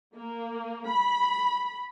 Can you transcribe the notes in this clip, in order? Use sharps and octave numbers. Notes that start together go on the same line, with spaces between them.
A#3
B5